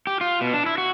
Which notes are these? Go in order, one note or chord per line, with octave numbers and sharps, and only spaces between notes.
G4
F4
B2
D4
E4
F#4